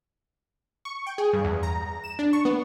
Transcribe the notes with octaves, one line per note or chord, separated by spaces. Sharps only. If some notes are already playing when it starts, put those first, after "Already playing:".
C#6
G5
G#4
G2
E2
A#5
E7
D4
C#6
B3